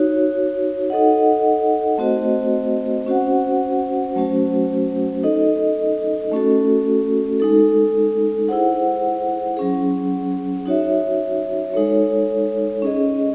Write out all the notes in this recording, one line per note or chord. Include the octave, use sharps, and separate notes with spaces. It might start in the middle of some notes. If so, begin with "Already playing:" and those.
Already playing: D#4 F#4 C#5
D#4 A4 D#5 F#5
A3 C4 F#4 C5 D#5
C#4 F#4 C5 F#5
F#3 A3 C#4 F#4 C5
D#4 A4 D#5
A3 C#4 F#4 A4
G#3 D#4 A4
E4 G#4 C5 F#5
F#3 C#4 G#4
D#4 F#4 C#5 E5
G#3 D#4 A4 C#5
C#4 G#4 D#5